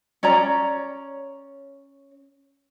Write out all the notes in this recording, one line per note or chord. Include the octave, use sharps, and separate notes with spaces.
C#4 C#5 D5 A#5